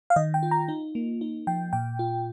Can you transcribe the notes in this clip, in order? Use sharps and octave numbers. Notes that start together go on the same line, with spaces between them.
F5
D#3 D#5
G5
F4
A#5
D#4
A#3
D#4
F3 G5
A#2 G5
F4